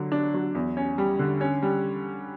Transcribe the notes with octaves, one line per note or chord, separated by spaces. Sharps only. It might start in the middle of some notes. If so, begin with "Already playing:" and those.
Already playing: D3 F#3
D4
F#3
E2
C#4
G3
D3
C#4
G3